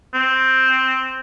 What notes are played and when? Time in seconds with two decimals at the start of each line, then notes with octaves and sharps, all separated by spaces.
0.14 C4